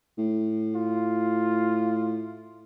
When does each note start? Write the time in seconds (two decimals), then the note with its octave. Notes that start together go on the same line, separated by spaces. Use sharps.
0.18 A2
0.75 F4